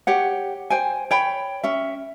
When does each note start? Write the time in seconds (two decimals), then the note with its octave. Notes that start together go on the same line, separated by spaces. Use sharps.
0.07 G4 C#5 F#5
0.70 C5 G5 G#5
1.11 C#5 G5 B5
1.63 C#4 E5